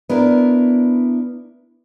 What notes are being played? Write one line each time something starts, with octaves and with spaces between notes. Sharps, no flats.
B3 D4 E4 A#4